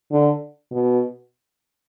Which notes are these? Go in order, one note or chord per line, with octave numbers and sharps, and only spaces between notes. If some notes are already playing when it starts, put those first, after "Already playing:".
D3
B2